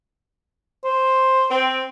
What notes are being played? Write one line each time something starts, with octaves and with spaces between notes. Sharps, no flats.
C5
C4